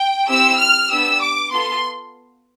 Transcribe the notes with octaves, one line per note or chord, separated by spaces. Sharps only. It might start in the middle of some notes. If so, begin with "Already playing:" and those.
Already playing: G5
C4 E4 G4 E6
F6
B3 D4 G4 E6
D6
B3 F4 A4 C6